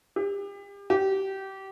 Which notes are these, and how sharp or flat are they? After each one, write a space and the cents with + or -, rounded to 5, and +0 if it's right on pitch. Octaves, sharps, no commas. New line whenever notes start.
G4 +35
G4 -20